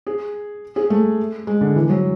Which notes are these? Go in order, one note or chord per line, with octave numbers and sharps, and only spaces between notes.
G#4
G#4
A3
G#3
D3
E3
F#3